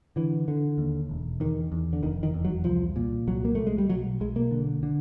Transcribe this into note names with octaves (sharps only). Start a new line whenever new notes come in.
D3 E3
D3
D#2
E1
E2 D#3
E2
D3
F1 D#3
D#3
E2
F#3
C2 F3
A#2
C2 F#3
A#3
C2 A3
G#3
G3
B1 F#3
B1 G#3
A#3
D3
D3